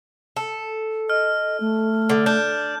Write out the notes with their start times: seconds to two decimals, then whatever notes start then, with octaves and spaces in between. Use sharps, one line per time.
0.37 A4
1.10 D#5 F6
1.61 A3
2.10 D3
2.26 D4 G6